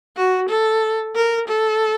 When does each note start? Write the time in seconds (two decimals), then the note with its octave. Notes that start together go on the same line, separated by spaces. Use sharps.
0.16 F#4
0.49 A4
1.15 A#4
1.48 A4